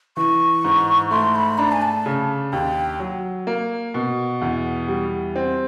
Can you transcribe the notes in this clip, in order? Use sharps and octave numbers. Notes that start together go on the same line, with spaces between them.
E3 C#6
G#2
A3 C6
B5
D4 A#5
G#5
A5
C#3
D#2 G5
F#3
A#3
B2
E2
G3
C4